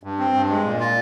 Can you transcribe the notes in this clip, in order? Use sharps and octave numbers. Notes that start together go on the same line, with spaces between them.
G2
C4
G2
G#3
A#2
F4